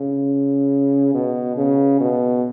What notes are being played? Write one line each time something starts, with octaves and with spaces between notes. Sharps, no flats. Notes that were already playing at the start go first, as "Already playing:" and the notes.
Already playing: C#3
B2
C#3
B2